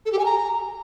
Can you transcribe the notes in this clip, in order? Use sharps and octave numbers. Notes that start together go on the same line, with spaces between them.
A4
G4
G#5
A#5